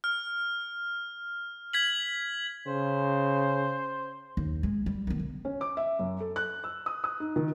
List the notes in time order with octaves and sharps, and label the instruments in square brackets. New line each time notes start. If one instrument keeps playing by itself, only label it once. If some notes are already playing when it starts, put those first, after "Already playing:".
[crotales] F6
G#6 B6 F#7
[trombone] C#3 [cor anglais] C5
[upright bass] D#2
G#3
G3
D#3 B3
D3
[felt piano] C#4
D6
E5
F#2
A4
F#6
E6
D#6
D#6
D#4
D#3